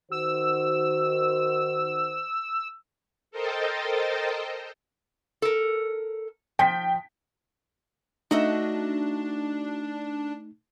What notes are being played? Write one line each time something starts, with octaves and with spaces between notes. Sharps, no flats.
D#3 F#4 C5 E6
A4 A#4 C5 D#5 G5 A5
A4 A#4
F3 G5 B6
A3 D4 D#4 F#4 D#5 E5